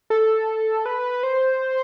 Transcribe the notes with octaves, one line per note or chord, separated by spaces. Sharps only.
A4
B4
C5